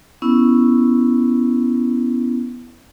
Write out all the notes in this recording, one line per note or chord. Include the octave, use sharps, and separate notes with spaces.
B3 C#4 E4